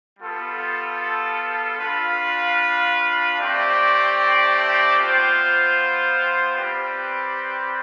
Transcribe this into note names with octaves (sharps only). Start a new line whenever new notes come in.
G3 B3 F4 A4
D4 F4 B4 F5
A3 C4 G4 D5
B3 F4 C5 G5
G3 C4 G4 B4 D5